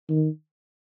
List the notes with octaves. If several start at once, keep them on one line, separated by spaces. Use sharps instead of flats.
D#3